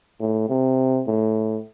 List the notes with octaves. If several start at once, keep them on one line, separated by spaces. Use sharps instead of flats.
A2
C3
A2